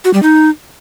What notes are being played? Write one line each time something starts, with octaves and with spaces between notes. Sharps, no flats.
F#4
G3
D#4